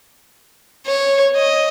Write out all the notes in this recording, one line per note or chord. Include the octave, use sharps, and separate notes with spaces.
C#5
D#5